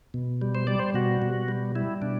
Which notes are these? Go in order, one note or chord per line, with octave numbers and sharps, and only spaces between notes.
B2
G3
C5
G3 D5
C5
B2 F#4
B2
G3
G3 E4
B2 D4